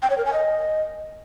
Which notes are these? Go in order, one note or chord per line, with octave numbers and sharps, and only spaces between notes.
G5
C#5
A#4
G#5
D#5